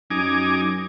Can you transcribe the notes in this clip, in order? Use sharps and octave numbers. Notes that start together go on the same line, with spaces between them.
F#2 D#4 G#5 D6